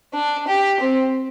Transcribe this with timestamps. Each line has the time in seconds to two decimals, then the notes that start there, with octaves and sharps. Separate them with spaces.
0.14 D4
0.47 G4
0.80 C4